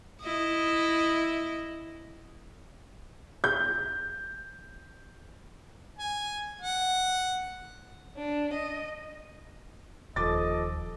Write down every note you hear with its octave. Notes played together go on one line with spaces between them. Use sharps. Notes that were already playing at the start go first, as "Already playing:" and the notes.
E4 D#5
G6
G#5
F#5
D4
D#5
D#1 F3 A4 D#5 D6 A6